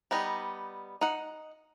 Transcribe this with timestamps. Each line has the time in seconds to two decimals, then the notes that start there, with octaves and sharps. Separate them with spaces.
0.11 G3 B3 D#4
1.01 D#4 F#5